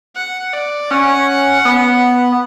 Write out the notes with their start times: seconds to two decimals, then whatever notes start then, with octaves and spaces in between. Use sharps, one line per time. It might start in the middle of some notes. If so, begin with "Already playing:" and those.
0.16 F#5
0.54 D5
0.90 C#4 F#5
1.65 B3